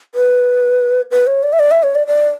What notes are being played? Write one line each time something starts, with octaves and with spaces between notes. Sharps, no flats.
B4
B4
C#5
D5
E5
D5
E5
C#5
D5
D5